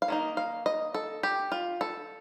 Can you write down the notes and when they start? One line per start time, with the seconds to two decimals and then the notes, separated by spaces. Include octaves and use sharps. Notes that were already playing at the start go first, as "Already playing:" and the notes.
0.02 F5
0.08 D#3 A#3 D#4
0.37 F5
0.66 D#5
0.94 A4
1.23 G4
1.52 F4
1.81 A4